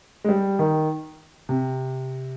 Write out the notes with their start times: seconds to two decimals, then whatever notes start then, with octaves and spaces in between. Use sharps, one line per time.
0.24 G#3
0.29 G3
0.59 D#3
1.49 C3